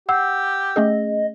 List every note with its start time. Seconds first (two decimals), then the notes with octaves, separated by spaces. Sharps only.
0.09 G4 F#5 E6
0.76 A3 C#4 G#4 D#5